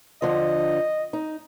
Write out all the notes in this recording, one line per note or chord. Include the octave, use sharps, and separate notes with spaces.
D3 F3 D#5
D#4